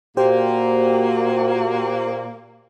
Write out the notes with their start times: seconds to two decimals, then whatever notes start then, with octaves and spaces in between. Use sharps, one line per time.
0.17 A#2 A#3 F#4 G4 C5 G5